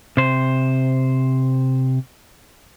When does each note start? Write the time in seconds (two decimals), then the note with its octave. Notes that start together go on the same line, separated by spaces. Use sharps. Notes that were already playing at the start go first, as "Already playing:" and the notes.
0.17 C3 C5